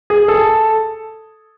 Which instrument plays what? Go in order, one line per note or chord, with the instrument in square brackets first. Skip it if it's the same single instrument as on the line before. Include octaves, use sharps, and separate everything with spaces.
[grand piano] G#4
A4